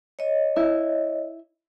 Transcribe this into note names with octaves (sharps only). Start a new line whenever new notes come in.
C#5 D#5
E4